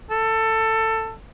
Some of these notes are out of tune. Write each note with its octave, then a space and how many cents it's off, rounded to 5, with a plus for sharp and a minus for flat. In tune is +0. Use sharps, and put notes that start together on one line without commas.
A4 +20